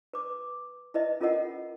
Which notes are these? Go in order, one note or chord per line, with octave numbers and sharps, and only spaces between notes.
B4 D6
E4 B4 D#5 E5
C#4 F4 A4 A#4 D#5 F#5